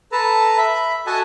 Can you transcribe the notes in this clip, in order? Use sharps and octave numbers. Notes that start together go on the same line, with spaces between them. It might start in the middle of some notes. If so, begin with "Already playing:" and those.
A4 B4 A5 A#5
E5 B5
F#4 A4 D#5 F#5 G#5 A5